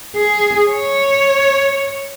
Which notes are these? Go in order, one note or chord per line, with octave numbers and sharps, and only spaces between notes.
G#4
C#5